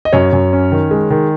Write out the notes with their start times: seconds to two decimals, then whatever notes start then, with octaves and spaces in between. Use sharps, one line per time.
0.05 D#5
0.13 F#2 C#5
0.33 F#2
0.53 C#4
0.72 D#3
0.91 G#3
1.10 D#3